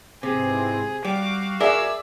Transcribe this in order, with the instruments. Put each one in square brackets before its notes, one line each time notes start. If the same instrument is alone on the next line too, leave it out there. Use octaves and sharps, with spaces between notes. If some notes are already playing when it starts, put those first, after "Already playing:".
[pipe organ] G#2 E3 C4 [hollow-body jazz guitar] C3 [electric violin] G#4
[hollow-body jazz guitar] G3 [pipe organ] F#4 F5 [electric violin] D6
[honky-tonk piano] G#4 D5 E5 [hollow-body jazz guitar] A#4 [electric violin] E6